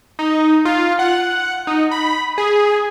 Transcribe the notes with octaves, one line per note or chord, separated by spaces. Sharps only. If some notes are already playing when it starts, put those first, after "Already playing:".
D#4
F4
F#5
D#4
B5
G#4